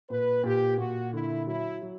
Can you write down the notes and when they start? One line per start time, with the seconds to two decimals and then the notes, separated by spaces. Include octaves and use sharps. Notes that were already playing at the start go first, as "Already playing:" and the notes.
0.10 A#2 B4
0.44 A#2 G4
0.78 A#2 F#4
1.13 D3 E4
1.47 F#3 E4
1.82 F#3